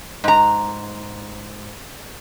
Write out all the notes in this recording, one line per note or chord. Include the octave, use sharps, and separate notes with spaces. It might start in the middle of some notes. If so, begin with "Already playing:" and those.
G#2 A#5